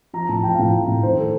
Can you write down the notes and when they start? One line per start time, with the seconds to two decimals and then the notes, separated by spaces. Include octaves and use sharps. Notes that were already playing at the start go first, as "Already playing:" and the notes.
0.13 F3 A#5
0.29 A2 A5
0.43 F3 G5
0.54 F5
0.59 A2 G5
0.74 F3
0.88 A2
1.03 D#3 C5
1.18 A4